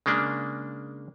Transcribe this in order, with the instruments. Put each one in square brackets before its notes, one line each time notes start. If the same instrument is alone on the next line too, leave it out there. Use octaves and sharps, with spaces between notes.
[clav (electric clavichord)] C#3 G#3 A#3 D4